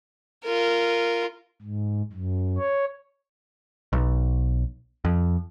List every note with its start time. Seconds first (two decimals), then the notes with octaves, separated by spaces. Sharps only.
0.45 F4 A#4
1.62 G#2
2.13 F#2
2.58 C#5
3.93 B1
5.05 F2